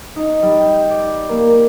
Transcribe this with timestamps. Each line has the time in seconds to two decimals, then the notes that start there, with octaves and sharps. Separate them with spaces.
0.16 D#4
0.42 G3
0.61 G6
0.90 D5
1.29 A#3